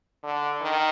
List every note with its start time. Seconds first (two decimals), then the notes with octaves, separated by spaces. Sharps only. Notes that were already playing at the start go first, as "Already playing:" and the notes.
0.24 D3
0.61 D#3